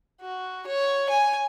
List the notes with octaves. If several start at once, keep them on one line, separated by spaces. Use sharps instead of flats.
F#4
C#5
G#5